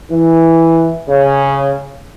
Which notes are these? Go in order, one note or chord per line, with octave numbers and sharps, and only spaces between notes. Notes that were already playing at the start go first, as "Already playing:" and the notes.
E3
C#3